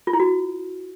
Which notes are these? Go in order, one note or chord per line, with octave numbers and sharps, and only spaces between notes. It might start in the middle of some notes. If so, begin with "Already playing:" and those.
F4
E4
F#4